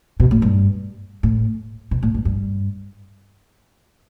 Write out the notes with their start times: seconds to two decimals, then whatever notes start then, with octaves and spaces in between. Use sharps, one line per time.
0.20 B2
0.31 A2
0.42 G2
1.23 A2
1.91 B2
2.03 A2
2.14 G2
2.25 G2